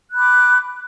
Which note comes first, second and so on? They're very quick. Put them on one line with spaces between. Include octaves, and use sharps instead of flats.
F#6 B5 D6